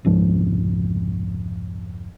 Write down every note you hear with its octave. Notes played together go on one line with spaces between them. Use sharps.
F1 C#2 G#2 F3